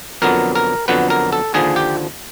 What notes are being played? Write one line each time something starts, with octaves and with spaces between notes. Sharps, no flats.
F2 D3 F#3 B3 A#4
A#4
F2 D3 F#3 B3 B4
A#4
A4
D#2 D3 F3 G#4
G4